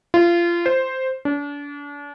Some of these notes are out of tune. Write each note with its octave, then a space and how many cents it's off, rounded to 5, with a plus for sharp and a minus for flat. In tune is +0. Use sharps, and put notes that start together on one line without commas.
F4 -25
C5 +0
D4 -35